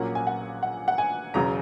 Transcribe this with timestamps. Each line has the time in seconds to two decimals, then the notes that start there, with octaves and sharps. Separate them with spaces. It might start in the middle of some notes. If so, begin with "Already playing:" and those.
Already playing: A#1 A#2 F#3 A#3 C#4 F#5
0.15 G#5
0.27 F#5
0.63 F#5
0.88 F#5
0.98 G#5
1.34 E1 E2 C#3 F#3 A#5